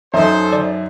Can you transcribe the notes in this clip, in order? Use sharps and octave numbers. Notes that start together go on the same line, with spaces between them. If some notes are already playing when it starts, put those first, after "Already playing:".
F#2 D#4 A4 C5 E5
D5